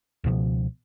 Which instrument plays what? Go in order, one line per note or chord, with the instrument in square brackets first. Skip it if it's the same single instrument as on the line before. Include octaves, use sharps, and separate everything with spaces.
[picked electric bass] C#2 B2 F3